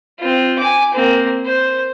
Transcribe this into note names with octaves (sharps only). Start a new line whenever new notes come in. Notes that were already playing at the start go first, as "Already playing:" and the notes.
C4 F4
G#5 D6
A#3 C4
C5